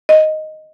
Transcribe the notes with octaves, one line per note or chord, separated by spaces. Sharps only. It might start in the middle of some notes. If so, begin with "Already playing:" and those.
D#5